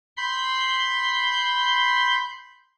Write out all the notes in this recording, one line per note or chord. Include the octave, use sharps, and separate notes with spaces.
B5 C6 G6